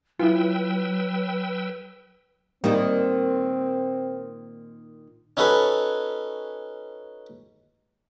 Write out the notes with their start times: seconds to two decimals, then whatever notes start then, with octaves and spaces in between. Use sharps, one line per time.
0.19 F#3 E4 F4 B4 G5 E6
2.64 A#2 D#3 G3 A#3 C4 D#4
5.37 C#4 D#4 F#4 A4 B4